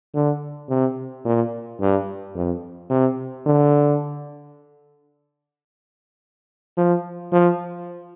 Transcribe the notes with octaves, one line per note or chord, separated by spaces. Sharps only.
D3
C3
A#2
G2
F2
C3
D3
F3
F3